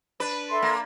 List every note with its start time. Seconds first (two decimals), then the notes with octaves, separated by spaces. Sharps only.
0.20 D4 B4
0.49 A4 E5 C6
0.62 A#3